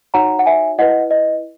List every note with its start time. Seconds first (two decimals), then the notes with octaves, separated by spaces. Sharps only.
0.14 D#4 F#4 C#5 F#5 A#5
0.39 F#5
0.46 E5 G#5
0.78 E4 B4 D#5 F#5
1.11 D#5